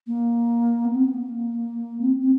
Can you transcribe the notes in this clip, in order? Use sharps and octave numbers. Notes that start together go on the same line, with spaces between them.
A#3
B3
C4
B3
A#3
C4
C4